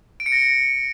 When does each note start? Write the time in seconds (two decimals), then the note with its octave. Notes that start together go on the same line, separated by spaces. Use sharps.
0.20 D7
0.26 C#7
0.32 A#6